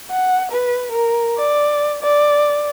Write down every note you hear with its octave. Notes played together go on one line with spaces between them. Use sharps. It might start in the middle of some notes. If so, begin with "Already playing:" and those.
F#5
B4
A#4
D5
D5